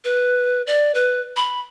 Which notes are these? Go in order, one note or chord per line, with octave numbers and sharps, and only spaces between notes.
B4
D5
B4
B5